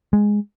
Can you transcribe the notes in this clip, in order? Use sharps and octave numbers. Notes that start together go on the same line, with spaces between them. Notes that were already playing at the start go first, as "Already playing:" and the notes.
G#3